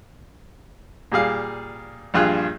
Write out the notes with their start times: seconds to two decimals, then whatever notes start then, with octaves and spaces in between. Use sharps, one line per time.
1.12 A#2 G3 G#4 F5
2.14 A#1 G2 F4 G#4 F#6